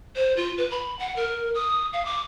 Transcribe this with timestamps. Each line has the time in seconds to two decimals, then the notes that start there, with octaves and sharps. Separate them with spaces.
0.16 C5
0.37 F4
0.58 B4
0.71 B5
0.99 F#5
1.16 A#4
1.55 D#6
1.93 F5
2.05 D6